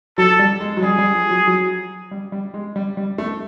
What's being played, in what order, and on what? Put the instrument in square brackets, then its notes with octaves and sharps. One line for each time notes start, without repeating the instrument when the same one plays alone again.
[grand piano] F#3 [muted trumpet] A4
[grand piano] G3
G#3
F#3
[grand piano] G3 [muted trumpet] G#4
[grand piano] G3
F3
F#3
F#3
G3
G3
G#3
G3
G3
A3